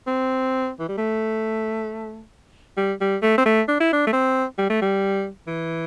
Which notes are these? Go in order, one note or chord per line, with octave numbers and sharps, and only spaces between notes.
C4
E3
G3
A3
G3
G3
A3
C4
A3
D4
E4
D4
A3
C4
G3
A3
G3
E3